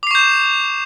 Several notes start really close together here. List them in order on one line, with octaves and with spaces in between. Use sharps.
D6 C7 C#6 G6 E7